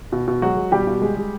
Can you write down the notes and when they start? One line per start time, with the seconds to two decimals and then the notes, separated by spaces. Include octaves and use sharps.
0.12 B2
0.27 B2
0.42 F#3 G#3 F#4
0.57 G#3
0.72 B2 G3 G4
0.87 B2
1.02 G#3
1.17 G#3